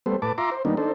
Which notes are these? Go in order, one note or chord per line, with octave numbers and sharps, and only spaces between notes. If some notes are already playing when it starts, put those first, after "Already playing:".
G3 A3 B3 C5
A2 B4 A5 D6
F4 E5 A#5 C6 D6
C5
D#3 G3 A#3 B3 D4 D#4
D4 D#4 A4 C5